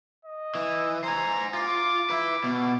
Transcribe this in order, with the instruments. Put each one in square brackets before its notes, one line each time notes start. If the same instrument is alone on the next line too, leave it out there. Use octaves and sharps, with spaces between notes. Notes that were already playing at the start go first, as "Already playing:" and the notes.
[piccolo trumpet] D#5
[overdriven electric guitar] E3
[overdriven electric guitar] C5 G#5 [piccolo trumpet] A#5
[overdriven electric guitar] F4 [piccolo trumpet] D6
[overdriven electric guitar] B4 E5
B2